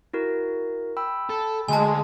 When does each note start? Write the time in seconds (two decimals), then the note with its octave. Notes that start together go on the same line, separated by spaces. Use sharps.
0.13 E4 F#4 A#4
0.97 G5 B5 E6
1.29 A4
1.68 D2 G#3 G#5 A5